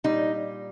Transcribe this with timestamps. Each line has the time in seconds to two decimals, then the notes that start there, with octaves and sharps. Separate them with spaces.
0.04 A#2 G3 D#4